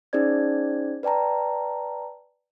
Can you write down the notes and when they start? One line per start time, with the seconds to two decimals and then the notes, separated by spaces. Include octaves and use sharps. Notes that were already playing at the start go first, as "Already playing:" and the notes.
0.13 C#4 D#4 G#4 C5 D5 G#6
1.03 B4 D5 G5 A5 A#5